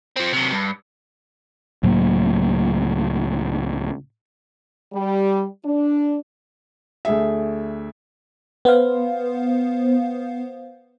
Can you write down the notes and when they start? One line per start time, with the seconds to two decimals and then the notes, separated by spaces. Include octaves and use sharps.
0.16 F3 C4
0.33 C3 F#3
0.51 G2
1.83 C#2 A2 F#3 A#3
4.94 G3
5.65 D4
7.05 D2 A3 G#4 E5
8.65 B3 C5 F5